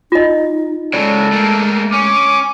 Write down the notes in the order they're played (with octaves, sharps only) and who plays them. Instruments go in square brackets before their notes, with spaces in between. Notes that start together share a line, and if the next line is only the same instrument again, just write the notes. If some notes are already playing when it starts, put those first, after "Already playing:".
[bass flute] D#4 [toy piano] F4 D#5
[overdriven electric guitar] C#3 F#3 [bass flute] G#3 [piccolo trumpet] A4 [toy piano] D5
[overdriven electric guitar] A3 A#3
[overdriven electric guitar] C#4 [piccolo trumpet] D6